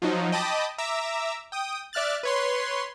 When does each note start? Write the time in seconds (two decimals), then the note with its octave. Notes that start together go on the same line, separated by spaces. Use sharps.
0.02 F3 F#3 D#4
0.32 D#5 G5 A5 B5 D6 D#6
0.78 E5 A#5 D6 E6
1.52 G5 D#6
1.93 D5 E5 F6 F#6 A6
2.23 B4 C#5 C6